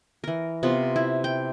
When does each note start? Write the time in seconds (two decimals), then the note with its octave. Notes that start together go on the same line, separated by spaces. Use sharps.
0.24 E3 A#4
0.63 C3 B3 F4
0.96 E4
1.24 G5